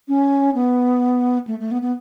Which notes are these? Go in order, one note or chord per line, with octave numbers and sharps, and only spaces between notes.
C#4
B3
A3
A3
B3
B3